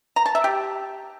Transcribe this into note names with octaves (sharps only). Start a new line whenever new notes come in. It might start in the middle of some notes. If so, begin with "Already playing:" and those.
A#5
A5
E5
G4